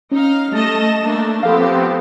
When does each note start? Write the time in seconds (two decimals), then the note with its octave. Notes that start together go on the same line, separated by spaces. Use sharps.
0.11 C#4 D#4 F5
0.52 G3 A3 D#5 A5 A#6 E7
1.03 A3 A#3 D4
1.43 F3 B3 C4 G4 A4 F5